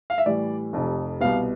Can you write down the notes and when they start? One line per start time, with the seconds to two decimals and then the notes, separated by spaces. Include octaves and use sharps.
0.10 F5
0.18 E5
0.26 A2 E3 G3 D5
0.73 F1 F2 C3
1.20 C2 B2 B3 F5